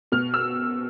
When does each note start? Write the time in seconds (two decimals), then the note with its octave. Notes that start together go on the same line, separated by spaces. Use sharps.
0.12 B2 F6
0.34 E6